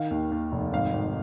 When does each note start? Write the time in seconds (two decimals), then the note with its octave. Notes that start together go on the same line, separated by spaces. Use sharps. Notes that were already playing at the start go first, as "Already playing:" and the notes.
Already playing: D#3 F5
0.11 D#2
0.32 D#2
0.52 F1
0.73 G#1 F5
0.93 G#1